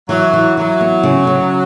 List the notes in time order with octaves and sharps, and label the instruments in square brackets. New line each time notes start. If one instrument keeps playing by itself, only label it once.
[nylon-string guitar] E3 [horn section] F#3
[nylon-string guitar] E3
[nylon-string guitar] E3 [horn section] F#3
[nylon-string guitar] B3
C#3
C#3